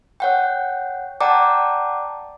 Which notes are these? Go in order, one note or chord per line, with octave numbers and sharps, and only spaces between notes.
C#5 F#5 G5
D5 F#5 G5 A5 A#5 D6